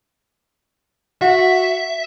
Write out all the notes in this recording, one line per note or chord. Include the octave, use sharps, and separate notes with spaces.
F#4 E5